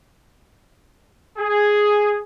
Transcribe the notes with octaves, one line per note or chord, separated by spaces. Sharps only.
G#4